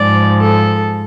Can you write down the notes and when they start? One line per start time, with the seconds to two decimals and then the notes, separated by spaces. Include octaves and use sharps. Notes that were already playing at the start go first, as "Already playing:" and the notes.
Already playing: G#2 F3 G#3 D5
0.41 A4